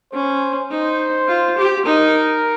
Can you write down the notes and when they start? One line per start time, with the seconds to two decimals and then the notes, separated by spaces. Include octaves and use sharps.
0.13 C#4 C5
0.71 D#4 C5
1.28 F4
1.57 G4
1.86 D#4 A#4